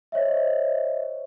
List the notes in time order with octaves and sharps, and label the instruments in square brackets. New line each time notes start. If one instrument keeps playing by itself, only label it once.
[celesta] C5 C#5 D#5 E5